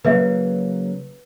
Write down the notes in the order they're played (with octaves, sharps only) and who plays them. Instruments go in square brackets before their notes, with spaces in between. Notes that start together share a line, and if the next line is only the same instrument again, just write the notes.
[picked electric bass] C#3 F#3 A#3 [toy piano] B4 E5